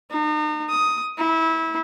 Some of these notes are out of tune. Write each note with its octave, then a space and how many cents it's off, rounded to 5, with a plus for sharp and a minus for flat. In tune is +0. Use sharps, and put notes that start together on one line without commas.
D#4 -40
D#6 +10
E4 -25